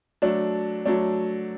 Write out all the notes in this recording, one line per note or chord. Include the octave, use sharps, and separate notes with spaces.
F#3 A3 D4
F#3 A3 D4